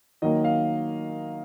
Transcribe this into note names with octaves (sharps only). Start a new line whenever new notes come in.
D#3 F#3 A#3 D#5
F5